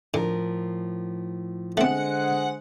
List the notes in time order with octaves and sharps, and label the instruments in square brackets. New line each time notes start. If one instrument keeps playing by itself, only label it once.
[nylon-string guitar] A2 F3 A#4 [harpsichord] D3
[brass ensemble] D3 G#3 C5 [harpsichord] A3 C4 [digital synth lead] F#5